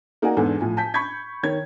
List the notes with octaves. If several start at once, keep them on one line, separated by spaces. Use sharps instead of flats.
A#3 D#4 F#4 D5 F#5 G#5
E2 G#2 D4 A4 G#5
A2 F3 G#5
G#5 A5 G6 B6
B5 C#6 G6 G#6 B6
D#3 C#5 G#6